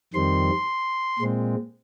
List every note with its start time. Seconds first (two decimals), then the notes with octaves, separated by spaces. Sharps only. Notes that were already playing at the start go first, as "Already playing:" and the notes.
0.14 F2 D#3 G3 C4 C6
1.19 A#2 G#3 C4